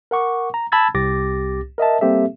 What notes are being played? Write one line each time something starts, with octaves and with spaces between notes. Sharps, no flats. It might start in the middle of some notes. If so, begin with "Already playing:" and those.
A#4 F#5 C#6 D6
A#5
A5 B5 E6 G#6 A6
C2 G4 D6 A6 A#6
A#4 D#5 E5 A5
G3 A#3 C4 G4 A4 E5